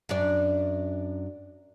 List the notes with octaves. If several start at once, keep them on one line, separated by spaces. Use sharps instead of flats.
F#2 D4 D5